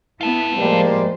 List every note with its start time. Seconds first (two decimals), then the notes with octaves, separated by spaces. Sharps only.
0.21 B3 E4 F4 A4
0.58 A2 F3 G3 G#3 A#3 C5